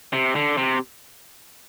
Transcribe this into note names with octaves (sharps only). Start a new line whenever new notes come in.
C3
D3
C3